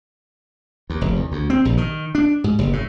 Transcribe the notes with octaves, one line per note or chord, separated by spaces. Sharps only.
D#2
F1
E2
D2
C4
A#1
D#3
D4
G#2
F#1
A2